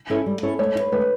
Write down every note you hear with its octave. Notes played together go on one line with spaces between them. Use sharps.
C#4 E4 A4 C#5
G3
C#4 E4 A4 C#5
A3 C#5
E4
B4
A3 B4